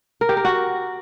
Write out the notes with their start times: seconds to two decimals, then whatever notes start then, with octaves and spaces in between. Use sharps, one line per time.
0.21 A#4
0.29 G4
0.37 A#4
0.45 F#4